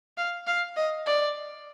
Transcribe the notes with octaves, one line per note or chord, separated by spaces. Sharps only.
F5
F5
D#5
D5